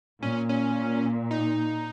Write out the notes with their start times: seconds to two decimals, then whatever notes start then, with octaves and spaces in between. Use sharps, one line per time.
0.22 A#2 C#4
0.49 C#4
1.31 D#4